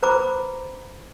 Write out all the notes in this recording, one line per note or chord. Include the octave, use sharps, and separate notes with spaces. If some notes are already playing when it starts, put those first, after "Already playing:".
B4 C5 A#5 B5 D6